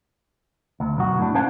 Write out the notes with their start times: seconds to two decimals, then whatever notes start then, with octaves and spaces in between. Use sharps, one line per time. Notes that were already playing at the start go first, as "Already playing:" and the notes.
0.80 D2
0.97 B1 F#2 F#4
1.18 A2 D4
1.35 C#4 D4 C5 F5 F#5 A5